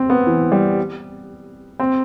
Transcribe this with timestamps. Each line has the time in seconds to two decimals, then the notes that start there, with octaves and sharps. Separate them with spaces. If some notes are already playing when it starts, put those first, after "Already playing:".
Already playing: C4
0.10 B3
0.27 E3
0.52 G3
1.80 C4